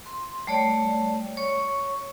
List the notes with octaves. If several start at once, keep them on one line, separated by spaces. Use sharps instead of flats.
C6
G3 A3 C#5 D5
C#5 C#6